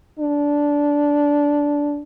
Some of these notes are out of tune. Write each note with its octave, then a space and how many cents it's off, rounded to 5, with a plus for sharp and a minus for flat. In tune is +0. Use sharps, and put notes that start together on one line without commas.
D4 -10